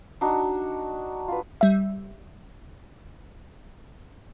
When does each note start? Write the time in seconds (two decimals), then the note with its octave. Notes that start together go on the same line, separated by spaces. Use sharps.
0.21 D4 D#4 F#4
1.28 F4 B4
1.61 G3 E5